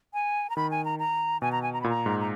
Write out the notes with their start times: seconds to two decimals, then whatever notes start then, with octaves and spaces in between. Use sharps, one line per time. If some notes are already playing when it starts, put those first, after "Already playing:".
0.14 G#5
0.50 A#5
0.56 D#3 B5
0.71 G#5
0.85 A#5
0.99 A#5
1.42 B2 G#5
1.52 A#5
1.63 G#5
1.73 A#5
1.81 B5
1.84 A#2
1.89 A#5
2.06 G#2
2.20 A#5